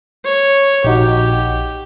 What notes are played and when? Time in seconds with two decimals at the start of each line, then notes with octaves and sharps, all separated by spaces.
0.24 C#5
0.84 A#1 D#4 F#4 G4